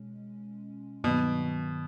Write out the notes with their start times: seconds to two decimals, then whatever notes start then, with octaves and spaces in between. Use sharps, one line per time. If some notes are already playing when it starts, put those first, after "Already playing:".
Already playing: B2 G#3 C#4
1.04 G2 B2 D#3 F#3